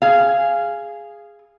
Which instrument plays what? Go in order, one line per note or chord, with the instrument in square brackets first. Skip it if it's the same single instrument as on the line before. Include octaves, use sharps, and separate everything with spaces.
[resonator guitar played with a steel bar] G#4 F5